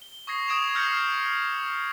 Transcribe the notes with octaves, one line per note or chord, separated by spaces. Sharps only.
G7
C#6 D#6 G#6 A#6 C7
D#6 G#6 D7 E7 F7
E6 F6 G6 A#6 C7 C#7